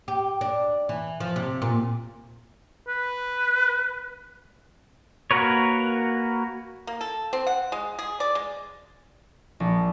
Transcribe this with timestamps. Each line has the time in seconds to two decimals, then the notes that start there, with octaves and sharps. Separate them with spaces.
0.08 G4
0.41 D4
0.89 E3
1.20 F3
1.36 C3
1.62 A#2
2.88 B4
5.31 A#3 F#4 A#4 B4 C#5
6.87 A#3
7.01 A4
7.33 C4
7.47 F#5
7.72 G#3
7.99 G#4
8.20 D5
8.35 G#3
9.60 A#1